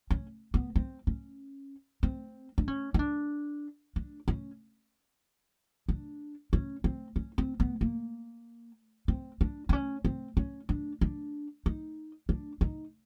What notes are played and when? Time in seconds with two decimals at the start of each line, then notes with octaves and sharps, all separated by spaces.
0.11 C#4
0.54 B3
0.76 C4
1.07 C#4
2.03 C4
2.58 D4
2.68 C#4
2.94 D#4
2.99 D4
3.96 D4
4.28 C#4
5.89 D4
6.53 C#4
6.84 C4
7.16 C#4
7.38 C4
7.60 B3
7.81 A#3
9.08 C4
9.41 D4
9.69 C4
9.73 C#4
10.05 C4
10.37 C#4
10.69 D4
11.01 D4
11.66 D#4
12.29 D4
12.61 D#4